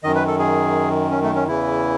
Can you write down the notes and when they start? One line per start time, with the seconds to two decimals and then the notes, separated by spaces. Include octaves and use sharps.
0.03 F#2 D#3 D#5
0.15 B4
0.27 A4
0.39 G#4
1.11 C#4
1.23 A3
1.35 C#4
1.47 E2 C#3 E3 E4